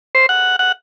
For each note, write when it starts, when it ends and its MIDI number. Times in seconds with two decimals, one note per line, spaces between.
0.15 0.26 72
0.29 0.56 78
0.59 0.72 78